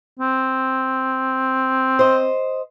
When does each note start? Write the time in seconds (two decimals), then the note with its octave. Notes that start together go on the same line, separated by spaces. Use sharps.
0.19 C4
1.99 C5 D#5